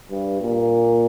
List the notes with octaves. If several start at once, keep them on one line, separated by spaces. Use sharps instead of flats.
G2
A#2